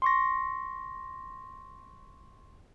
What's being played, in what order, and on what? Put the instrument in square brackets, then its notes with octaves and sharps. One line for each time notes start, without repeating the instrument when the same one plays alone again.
[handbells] C6 C#6 A#6